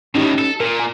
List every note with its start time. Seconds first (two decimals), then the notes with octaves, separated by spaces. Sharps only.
0.15 A2 D#3 C#4 D#4 G4
0.38 A4
0.60 A#2 A#4
0.80 G#5